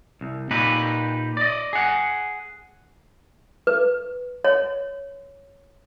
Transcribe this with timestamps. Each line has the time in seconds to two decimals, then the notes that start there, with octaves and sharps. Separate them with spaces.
0.21 C2
0.51 A#2 D#4 G4 B4
1.37 D5 D#5
1.73 G#4 F#5
3.67 B4
4.44 C#5